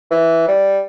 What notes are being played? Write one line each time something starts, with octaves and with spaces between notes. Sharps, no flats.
E3
G3